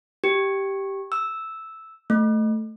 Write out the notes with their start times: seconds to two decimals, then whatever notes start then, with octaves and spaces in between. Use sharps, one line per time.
0.24 G4
1.12 E6
2.10 A3